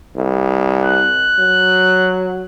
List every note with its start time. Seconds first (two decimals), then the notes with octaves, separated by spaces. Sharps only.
0.16 C2
0.83 F#6
1.39 F#3